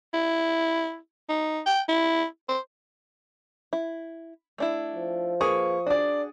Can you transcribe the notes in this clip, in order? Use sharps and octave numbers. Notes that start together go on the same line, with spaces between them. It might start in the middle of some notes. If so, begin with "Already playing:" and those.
E4
D#4
G5
E4
C5
E4
A3 D4 E4
F3
A#3 G#4 B4 C#6 D#6
D4 F#4 G#4 D5